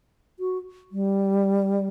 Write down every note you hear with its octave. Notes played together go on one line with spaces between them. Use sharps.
F#4
G3